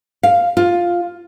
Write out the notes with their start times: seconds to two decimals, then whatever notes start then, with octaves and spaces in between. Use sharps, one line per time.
0.23 F5
0.57 F4